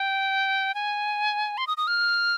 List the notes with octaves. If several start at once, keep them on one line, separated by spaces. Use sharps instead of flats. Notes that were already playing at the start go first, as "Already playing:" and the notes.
Already playing: G5
G#5
C6
D#6
D#6
F6